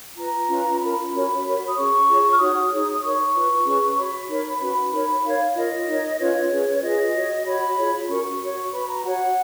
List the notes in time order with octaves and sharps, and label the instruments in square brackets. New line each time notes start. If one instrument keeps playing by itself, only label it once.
[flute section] F4 B4 A#5
C#4 F4 B4
C#4 F4 A#4 B5
C#4 F#4 A#4 C#5
F#4 A#4 C#5
D#6
C#4 G#4 C#5 C#6
F4 G#4 C#5
F6
D#4 F#4 C#5 D#6
D#4 G#4 C#5
D#6
D#4 A#4 C#5 C#6
F4 B4
C#4 G#4 B4
F#4 C#5 B5
D#4 A#4 C#5
C#4 F#4 B4 B5
D#4 A#4 C#5
D#4 A#4 C#5 F5
F4 A#4 C#5 D#5
D#4 A#4 C#5
C#4 F4 B4 C#5
C#4 G#4 B4
F4 G#4 B4 D#5
F#4 C#5
F#4 C#5 B5
F4 G#4 C#5
C#4 F#4 A#4 C#6
F#4 C#5
F#4 B4 B5
A#5
F#4 C#5 F#5